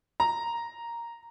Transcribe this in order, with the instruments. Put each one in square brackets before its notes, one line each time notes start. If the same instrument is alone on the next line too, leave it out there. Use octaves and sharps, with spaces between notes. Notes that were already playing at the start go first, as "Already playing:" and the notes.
[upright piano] A#5